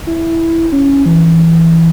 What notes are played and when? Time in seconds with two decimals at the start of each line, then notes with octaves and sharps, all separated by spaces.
0.07 E4
0.72 C#4
1.06 E3